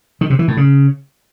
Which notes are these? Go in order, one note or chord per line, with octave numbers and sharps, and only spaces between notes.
D#3
C3
E3
A2
C#3